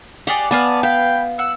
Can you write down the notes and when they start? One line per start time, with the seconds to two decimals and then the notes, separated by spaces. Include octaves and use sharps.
0.27 G4 G#4 D5 F#5
0.51 B3 D5 F5 G#5 A5
0.83 B4 F5 G5
1.39 F#5 E6